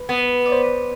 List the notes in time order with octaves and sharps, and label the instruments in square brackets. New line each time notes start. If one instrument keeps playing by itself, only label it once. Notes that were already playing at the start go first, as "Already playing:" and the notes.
Already playing: [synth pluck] B4
[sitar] B3
[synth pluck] D5
C5